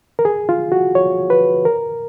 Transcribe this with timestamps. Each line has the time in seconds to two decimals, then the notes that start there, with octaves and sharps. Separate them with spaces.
0.19 A#4
0.25 G#4
0.49 F4
0.72 F#4
0.95 C#5
1.30 B4
1.65 A#4